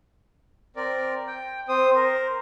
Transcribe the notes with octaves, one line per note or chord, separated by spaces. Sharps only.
C4 A#4 D5
G5
C4 C5 D#6
A#4 C5